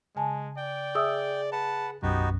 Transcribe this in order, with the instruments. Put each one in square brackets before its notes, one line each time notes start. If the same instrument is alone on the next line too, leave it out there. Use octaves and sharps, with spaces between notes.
[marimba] C#3 G#5 A5 [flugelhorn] G#3
[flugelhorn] D5 [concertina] G5
[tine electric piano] G#4 [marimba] E5 D#6 E6
[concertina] B4 F#5 [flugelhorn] A5
[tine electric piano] B1 F#2 [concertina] B3 D#4 F#4 [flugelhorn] G4